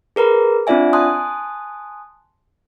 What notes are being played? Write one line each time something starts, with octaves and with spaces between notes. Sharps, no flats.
G#4 A#4 B4 A#5
C4 D4 F4 D5 E5 G#5
G#5 A5 C6 D#6 F#6